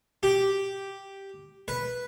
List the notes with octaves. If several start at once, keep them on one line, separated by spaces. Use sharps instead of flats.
G4
B4